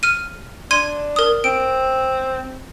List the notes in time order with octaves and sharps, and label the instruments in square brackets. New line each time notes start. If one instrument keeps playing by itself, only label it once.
[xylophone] F6 D#7
[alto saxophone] D4 [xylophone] C6 G#6 D#7
[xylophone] A#4 D#6
[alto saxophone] C4 [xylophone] D7